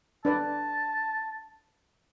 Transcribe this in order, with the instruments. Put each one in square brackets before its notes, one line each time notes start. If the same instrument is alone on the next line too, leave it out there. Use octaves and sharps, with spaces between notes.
[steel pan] D4 B4 D5 [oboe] A5